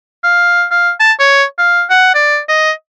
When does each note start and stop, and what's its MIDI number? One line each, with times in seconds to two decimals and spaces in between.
0.24 0.65 77
0.71 0.92 77
1.00 1.13 81
1.20 1.44 73
1.59 1.84 77
1.90 2.11 78
2.15 2.40 74
2.49 2.72 75